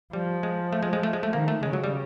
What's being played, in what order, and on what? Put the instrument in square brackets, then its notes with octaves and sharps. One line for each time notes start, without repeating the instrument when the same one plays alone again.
[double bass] F3 [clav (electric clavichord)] G3
[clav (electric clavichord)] G#3
A3
G#3
G#3
A3
G#3
A3
[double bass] D#3 [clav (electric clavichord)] A#3
[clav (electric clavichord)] A3
[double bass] C#3 [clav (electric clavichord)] G#3
[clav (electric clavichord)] F#3
G3